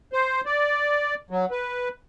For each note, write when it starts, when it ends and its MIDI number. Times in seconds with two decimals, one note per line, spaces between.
0.13 0.41 72
0.46 1.14 74
1.30 1.46 54
1.51 1.89 71